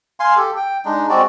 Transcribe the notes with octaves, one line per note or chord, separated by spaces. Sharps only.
F5 G#5 C6
G4 A4
G5
G#3 D4 D#4
G#3 C4 F#4 D5